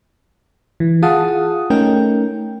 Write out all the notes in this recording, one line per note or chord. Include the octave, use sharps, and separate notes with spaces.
E3
F4 G#4 F5 F#5 A5 D#6
A3 C#4 D#4 A#4 G5